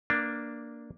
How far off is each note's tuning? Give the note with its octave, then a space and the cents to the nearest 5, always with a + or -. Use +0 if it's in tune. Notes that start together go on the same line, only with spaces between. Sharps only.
A#3 +0 D4 +0 B4 -25